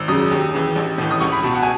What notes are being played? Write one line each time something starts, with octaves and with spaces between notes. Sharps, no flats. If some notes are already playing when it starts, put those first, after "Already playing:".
Already playing: G#1 E6
F#2 C#3 D#6
D#2
C#3 E3
A1
A2 E3
D#6
C#2 C#6
B5
B2 A5
F#5
G#5